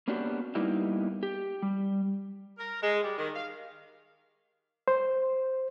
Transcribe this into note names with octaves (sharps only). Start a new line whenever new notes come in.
A#3 B3 C#4 D4 F#4 G4
G3 A#3 B3 D#4 E4 G4
G4
G3
A#4
G#3
G3
D#3
F5
C5